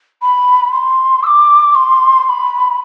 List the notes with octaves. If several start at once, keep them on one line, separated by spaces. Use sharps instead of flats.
B5
C6
E6
D6
C6
C6
B5